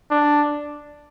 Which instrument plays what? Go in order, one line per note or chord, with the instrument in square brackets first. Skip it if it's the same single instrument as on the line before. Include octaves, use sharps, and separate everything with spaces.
[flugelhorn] D4